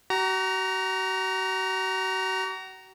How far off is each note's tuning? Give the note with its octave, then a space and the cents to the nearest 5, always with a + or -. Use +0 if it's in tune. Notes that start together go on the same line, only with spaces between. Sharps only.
F#4 +40 A#5 +0